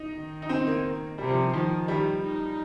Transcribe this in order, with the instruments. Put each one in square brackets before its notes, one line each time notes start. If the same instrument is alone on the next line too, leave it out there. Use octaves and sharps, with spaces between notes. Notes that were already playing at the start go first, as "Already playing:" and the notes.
Already playing: [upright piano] D#4
[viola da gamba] D#3
[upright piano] D#4
C4
A#3
[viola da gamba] C3 [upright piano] G3
[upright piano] F3
[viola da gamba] D#3 [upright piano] F3
[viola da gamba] D#3 [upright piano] G3
[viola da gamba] D#4